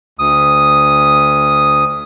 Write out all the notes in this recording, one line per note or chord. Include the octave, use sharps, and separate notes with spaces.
D2 D#6